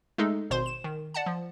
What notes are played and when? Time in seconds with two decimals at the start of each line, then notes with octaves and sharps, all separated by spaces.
0.18 G#3 A3 D#4 G#4 A4
0.50 G#1 B2 C5 C6
0.66 E7
0.84 D#3
1.14 D5 F#5 A5
1.26 F3